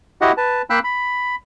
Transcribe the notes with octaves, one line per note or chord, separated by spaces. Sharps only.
E4 F#4 G4 D#5 F#5
B4 A5
A#3 F5 G5 B5 E6 F#6
B5